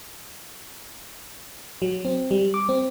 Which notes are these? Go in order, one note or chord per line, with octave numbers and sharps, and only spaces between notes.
F#3
C4
G3
D6
C4